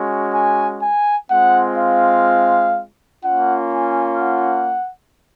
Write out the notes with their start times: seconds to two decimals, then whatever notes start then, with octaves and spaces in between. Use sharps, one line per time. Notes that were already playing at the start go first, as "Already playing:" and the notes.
Already playing: G#3 C#4 F#4
0.33 G#5
0.82 G#5
1.30 G#3 C4 F4 F#5
1.78 F5
3.24 A#3 C#4 F4 F#5
3.72 G#5
4.21 F#5